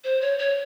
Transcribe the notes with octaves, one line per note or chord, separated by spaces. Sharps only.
C5
C#5
C#5